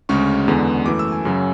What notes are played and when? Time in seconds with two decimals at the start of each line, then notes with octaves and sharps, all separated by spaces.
0.09 D2 C#3 G#3 C#4 C#6
0.48 E2 D3 G#3 B3
0.86 F#2 E3 A3 D6
0.99 E6
1.12 G#5
1.25 F#2 C#3 F#3 C#4 G#5